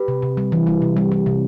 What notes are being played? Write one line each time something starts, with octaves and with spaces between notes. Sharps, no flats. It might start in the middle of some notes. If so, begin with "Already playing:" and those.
Already playing: G4 B4
C3
C3
G3
E3
G3
C3
G3
G3
C3